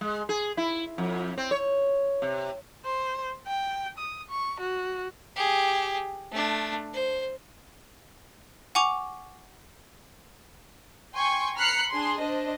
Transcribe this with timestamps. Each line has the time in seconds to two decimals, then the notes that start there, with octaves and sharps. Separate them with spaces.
0.01 G#3
0.29 G#4
0.57 E4
0.98 F2
1.38 C4
1.51 C#5
2.22 C3
2.86 C5
3.47 G5
3.98 D#6
4.30 C#6
4.60 F#4
5.36 G4 G#4
6.32 A3 D4
6.94 C5
8.75 F#5 G#5 C#6 D6 F7
11.13 G5 G#5 C6 C#6
11.56 A#5 B5 F6 F#6 C7 C#7
11.90 D4 G#4 C6
12.20 D4 C5 D#5